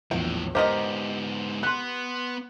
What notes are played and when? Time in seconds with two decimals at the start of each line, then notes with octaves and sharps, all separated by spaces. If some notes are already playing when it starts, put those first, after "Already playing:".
0.11 A#1 E2 A2 F#3 G5
0.55 G#2 B3 G4 A#4 C5 D#5
1.63 B3 C6 F#6